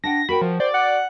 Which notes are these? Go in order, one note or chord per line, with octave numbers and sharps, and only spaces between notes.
D4 F#5 G5 A#6
F#4 A#4 G5 B5
F3
C5 D5
F#5